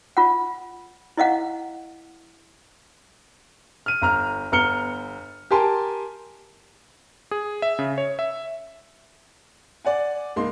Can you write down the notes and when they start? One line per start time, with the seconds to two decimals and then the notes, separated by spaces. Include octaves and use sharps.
0.17 F4 F#5
1.17 E4 D#5 F5 F#5
3.86 F6 D#7
4.02 G1 A#5 F6
4.52 G1 B3 A#5 F6 C#7 G7
5.51 G4 A#4 G#5 A5 C6
7.31 G#4
7.62 E5
7.79 C#3
7.98 C#5
8.19 E5
9.85 D5 F#5 G#5
10.36 C#2 A#3 D#4 C6